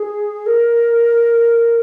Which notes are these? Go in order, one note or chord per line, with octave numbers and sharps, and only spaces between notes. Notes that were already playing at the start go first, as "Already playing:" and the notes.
Already playing: G#4
A#4